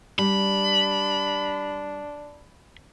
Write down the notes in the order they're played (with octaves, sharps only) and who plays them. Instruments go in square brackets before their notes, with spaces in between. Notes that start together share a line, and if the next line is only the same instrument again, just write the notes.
[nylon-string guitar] G3 [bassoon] D4 [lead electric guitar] B5